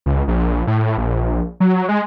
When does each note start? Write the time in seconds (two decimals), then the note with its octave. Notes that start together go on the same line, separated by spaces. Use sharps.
0.06 C#2
0.28 A#1
0.67 A2
0.98 A#1
1.60 F#3
1.89 G#3